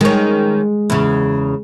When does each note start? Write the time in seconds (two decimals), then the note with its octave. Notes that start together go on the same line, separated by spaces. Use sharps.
0.01 D#3 G#3 C#4
0.90 E2 C#3